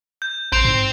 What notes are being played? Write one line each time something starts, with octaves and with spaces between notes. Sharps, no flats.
G6
A1 C4 G6 D7 F7
G#2